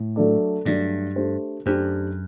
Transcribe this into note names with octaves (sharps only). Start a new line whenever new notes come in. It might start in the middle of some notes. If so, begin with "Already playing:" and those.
Already playing: A2
F#3 A3 D4 A4 D5
G2 F#3 A3 D4 A4 D5
A3 D4 G4 C5
F#2 A3 D4 G4 C5